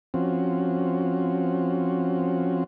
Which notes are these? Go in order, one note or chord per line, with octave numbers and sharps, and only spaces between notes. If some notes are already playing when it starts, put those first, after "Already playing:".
F3 C4 C#4 F#4